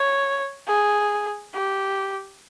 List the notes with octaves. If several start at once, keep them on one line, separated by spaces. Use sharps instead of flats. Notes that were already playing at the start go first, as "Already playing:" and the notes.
Already playing: C#5
G#4
G4